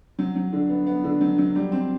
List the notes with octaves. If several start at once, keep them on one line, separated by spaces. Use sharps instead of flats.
F#3
F#3
D3
B3
B3
D3
F#3
F#3
G3
C4